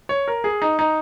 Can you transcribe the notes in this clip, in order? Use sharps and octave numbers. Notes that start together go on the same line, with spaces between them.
C#5
A#4
G#4
D#4
D#4